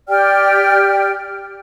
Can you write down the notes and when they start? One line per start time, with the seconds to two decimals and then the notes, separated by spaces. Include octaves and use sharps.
0.09 G4 D5 G5 F6